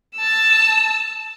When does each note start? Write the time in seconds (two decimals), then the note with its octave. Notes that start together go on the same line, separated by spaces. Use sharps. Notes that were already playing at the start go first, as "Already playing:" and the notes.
0.16 A5 E6